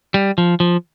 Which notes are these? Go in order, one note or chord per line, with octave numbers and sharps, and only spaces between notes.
G3
F3
F3